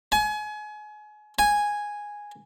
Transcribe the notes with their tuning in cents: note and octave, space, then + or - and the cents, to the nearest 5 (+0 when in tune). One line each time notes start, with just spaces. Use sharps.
G#5 +30
G#5 -5